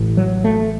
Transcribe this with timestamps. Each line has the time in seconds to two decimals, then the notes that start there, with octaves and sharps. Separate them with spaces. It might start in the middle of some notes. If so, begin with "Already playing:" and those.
Already playing: A1 A2
0.17 F#3
0.44 A3